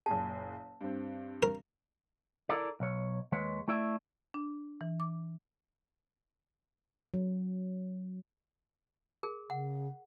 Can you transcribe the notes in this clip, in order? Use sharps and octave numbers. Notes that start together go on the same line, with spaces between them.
F#1 A#2 G#4 A5
G2 C4
A#4
E4 A4 A#4 D5
B1 C#5
D#2 D#3 G#3 B4 C#5
A3 E4 D5 E5
D4
E3
D6
F#3
G#4 A#4
C#3 F#5